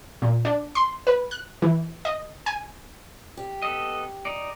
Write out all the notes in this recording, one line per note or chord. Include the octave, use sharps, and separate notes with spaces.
A#2
D4
C6
B4
F#6
E3
D#5
G#5
G4
B3 A4 D#5
D#4 D5